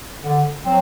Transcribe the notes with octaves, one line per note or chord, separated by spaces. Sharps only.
D3
F#3 C4